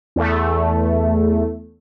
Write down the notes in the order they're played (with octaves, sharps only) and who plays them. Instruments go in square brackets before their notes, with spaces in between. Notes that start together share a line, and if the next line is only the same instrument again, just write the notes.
[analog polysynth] E2 A3